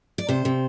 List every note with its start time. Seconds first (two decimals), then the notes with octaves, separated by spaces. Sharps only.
0.18 D5
0.28 C3 C5
0.45 C3